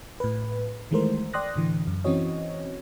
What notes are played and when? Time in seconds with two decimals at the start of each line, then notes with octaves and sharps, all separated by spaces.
0.20 A2 B4
0.91 D#3 E3 G#3 A3 A#4 C5
1.33 D5 G5 C6 D#6 F#6 A#6
1.56 A2 D3 E3
1.87 F#2
2.04 E3 C4 C#4 F#4 C#5 D#5